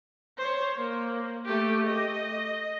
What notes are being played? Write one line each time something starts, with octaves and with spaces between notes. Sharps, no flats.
C5 C#5
A#3
A3 G4
D#5